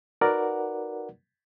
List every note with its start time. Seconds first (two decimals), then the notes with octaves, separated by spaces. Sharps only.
0.21 D#4 F#4 A#4 B4 D5 F#5